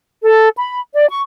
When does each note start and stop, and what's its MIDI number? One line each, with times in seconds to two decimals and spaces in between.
0.23 0.48 69
0.57 0.80 83
0.94 1.08 74
1.09 1.21 85